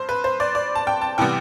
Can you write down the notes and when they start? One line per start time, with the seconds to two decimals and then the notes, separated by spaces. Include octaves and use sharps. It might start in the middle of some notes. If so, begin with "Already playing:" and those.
Already playing: G2 C5
0.09 B4
0.24 C5
0.40 D5
0.55 D5
0.75 A5
0.87 G5
1.01 A5
1.18 C3 E3 G3 B3 G5